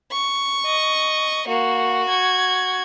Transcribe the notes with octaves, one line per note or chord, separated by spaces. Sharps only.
C#6
D#5
A#3 F#4
G#6